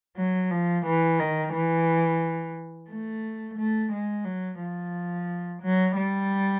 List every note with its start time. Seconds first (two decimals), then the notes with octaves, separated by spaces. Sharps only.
0.17 F#3
0.51 F3
0.86 E3
1.20 D#3
1.53 E3
2.90 A3
3.58 A3
3.92 G#3
4.25 F#3
4.60 F3
5.62 F#3
5.96 G3